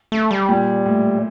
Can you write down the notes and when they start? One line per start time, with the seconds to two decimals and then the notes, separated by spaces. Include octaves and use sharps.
0.12 A3
0.31 G3
0.49 A#2
0.86 A2